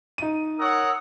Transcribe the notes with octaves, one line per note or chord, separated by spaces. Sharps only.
D#4 D#7
A#4 C#5 F#5 D#6 E6